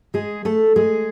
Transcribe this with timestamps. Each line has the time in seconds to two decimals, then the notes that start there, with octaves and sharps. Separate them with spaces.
0.14 G#3 G#4
0.45 A3 A4
0.76 G#3 G#4